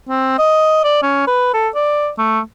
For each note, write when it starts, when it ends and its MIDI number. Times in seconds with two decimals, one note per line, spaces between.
0.09 0.38 60
0.39 0.80 75
0.84 1.02 74
1.03 1.24 61
1.27 1.49 71
1.54 1.69 69
1.75 2.09 74
2.18 2.40 57